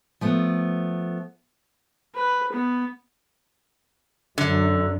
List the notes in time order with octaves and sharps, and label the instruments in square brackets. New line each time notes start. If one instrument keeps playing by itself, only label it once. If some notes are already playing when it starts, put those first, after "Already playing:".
[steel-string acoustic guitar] F3 A3 B3
[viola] B4
B3
[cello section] F#2 [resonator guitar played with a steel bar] D3